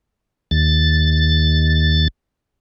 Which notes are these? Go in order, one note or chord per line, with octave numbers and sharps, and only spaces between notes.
D#2 A6